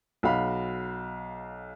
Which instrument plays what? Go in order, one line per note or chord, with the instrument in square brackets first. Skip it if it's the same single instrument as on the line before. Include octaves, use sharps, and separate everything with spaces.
[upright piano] B1 F#4 F5 B5